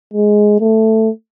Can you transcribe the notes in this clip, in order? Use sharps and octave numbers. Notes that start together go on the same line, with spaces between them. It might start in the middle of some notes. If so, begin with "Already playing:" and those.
G#3
A3